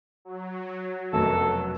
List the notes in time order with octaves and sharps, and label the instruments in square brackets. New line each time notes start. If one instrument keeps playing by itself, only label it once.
[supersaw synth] F#3
[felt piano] F1 F#2 B2 [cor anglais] A4